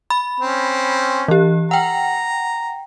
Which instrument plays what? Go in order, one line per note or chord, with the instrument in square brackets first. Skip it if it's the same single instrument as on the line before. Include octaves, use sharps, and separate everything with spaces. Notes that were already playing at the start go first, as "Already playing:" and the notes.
[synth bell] B5
[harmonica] C4 C#4
[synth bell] E3 G4
[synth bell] F#5 G5 [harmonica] A#5